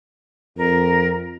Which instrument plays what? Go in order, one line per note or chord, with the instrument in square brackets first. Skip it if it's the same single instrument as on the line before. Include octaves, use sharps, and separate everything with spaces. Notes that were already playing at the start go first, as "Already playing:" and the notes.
[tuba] F2 [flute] A#4